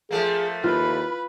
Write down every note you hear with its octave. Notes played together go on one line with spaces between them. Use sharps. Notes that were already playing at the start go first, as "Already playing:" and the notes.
F3 A3 A#3 G#4
D#2 F4 B4 B5